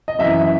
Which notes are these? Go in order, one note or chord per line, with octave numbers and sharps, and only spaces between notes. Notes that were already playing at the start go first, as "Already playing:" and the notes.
D#5
F#2 E3 E5